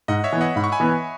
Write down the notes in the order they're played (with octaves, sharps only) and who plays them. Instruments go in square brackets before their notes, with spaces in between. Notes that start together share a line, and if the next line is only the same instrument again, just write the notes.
[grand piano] G#2 [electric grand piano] D#5 F#5
[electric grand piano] C#5 E5
[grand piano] E3 B3
[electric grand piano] D#5 F#5
[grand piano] G#2 [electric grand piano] B5
[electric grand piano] C#6
G#5 B5
[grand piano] E3 B3